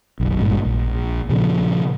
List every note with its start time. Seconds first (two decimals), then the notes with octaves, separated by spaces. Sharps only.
0.20 F#1 B1
0.40 G#1 G2 A#2 G#3
0.65 A#1
1.30 A#2 C#3 F3